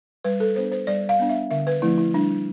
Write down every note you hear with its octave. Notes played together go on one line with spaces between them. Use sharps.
G3 B4
A4
B3 D4 C5
C5
G3 D5
F5
B3 D4
E5
D3 E5
B4
F3 A3 C4 E4
E4
G3 D4